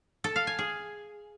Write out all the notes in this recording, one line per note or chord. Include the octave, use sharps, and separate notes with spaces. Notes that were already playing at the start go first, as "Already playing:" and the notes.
A4
F5
G#5
G#4